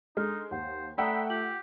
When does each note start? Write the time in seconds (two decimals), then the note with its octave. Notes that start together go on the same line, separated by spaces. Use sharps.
0.17 G#3 D4 D#4 A4 F6
0.51 D#2 C5 F#5
0.98 A3 D5 F#5 G5 A#5 B5 D#6 E6
1.30 F4 G4 F#7